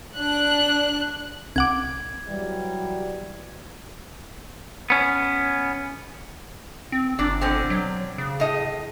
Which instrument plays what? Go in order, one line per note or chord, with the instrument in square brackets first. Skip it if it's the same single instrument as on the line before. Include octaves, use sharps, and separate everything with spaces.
[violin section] D4 F#6
[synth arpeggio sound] C2 F#5 D6 [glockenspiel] G#6
[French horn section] E3 F#3 G3
[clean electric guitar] B3 C#4
[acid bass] C4
[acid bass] G1 [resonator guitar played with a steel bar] D4 D5
[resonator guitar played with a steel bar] B2 D3 C4
[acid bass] F#3
C#3
[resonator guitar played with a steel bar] A2 D#5